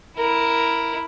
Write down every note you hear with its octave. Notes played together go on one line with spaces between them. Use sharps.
E4 A#4